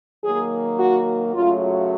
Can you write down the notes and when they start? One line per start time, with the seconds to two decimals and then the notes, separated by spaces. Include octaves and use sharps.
0.24 D#3 F#3 A#3 G#4
0.79 F#4
1.34 F#2 C#3 F#3 A3 F4